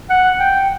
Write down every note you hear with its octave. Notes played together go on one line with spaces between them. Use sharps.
F#5
G5